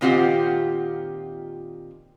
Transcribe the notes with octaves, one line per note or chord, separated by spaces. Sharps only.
A#2 D#3 C4 F4 G4 F#5